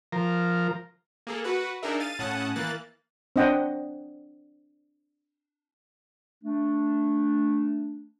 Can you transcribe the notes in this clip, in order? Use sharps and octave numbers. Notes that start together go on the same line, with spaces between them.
F3 A#4
A#3 G#4 A4
F#4 B4 F#5
D4 D#4 G#4 A#4 E5
F5 A6 D#7
A2 C#4 F#5 A5 D#6 F#6
E3 A#3 F#6 A6
C4 D4 D#5 F#5 G5
A3 D4